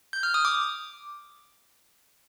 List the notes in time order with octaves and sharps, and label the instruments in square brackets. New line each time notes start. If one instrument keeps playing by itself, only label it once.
[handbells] G6
F6
D#6
D6